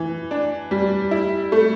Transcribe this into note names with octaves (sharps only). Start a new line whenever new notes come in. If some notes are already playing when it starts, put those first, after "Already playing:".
Already playing: E3
D4
G3
E4
A3